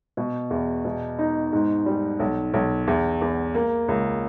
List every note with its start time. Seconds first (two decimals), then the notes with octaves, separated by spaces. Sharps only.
0.17 B2
0.50 E2
0.85 B2
1.19 D#4
1.52 G#2
1.86 G3
2.19 B1
2.54 B1
2.87 E2
3.21 E2
3.54 A#3
3.88 C#2